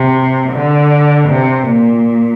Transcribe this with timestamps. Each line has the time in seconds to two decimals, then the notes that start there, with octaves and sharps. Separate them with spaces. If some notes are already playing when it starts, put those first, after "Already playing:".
Already playing: C3
0.52 D3
1.29 C3
1.68 A#2